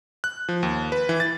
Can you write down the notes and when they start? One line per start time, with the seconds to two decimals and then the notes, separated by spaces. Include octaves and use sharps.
0.24 F#6
0.49 F3
0.63 D#2
0.92 B4
1.09 E3
1.20 A6